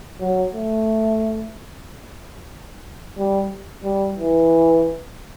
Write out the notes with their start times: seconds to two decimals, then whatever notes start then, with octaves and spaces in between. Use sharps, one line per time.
0.20 F#3
0.53 A3
3.18 G3
3.84 G3
4.18 E3